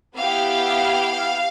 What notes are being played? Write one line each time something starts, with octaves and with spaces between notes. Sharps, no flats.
B3 E4 G4 F5